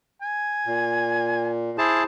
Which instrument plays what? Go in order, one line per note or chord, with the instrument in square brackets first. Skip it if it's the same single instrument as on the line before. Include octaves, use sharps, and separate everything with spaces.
[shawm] G#5
[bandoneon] A#2
[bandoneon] E4 G#4 A5 [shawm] C5